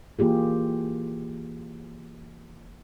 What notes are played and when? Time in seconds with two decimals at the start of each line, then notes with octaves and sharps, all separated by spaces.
0.19 E3 A#3 F4 G4 G#4